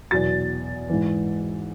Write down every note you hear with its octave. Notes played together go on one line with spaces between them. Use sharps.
E2 B2 F#3 A6
G#2 E3